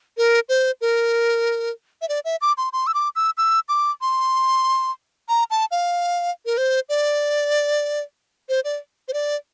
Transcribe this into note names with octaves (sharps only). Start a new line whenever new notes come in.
A#4
C5
A#4
E5
D5
E5
D6
C6
C6
E6
D6
E6
E6
D6
C6
A#5
A5
F5
A#4
C5
D5
C5
D5
C5
D5